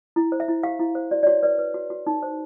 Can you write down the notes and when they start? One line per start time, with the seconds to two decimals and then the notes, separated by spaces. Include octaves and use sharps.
0.16 E4
0.32 C5
0.40 E5
0.48 E4
0.63 G4 F5
0.79 E4
0.95 C5
1.11 F#4 D5
1.23 D5
1.27 F#4 C#5
1.43 B4 D5
1.59 B4
1.74 F#4
1.90 F#4
2.07 D#4
2.23 C5